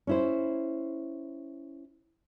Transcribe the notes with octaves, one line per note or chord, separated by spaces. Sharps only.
C#4 E4 C5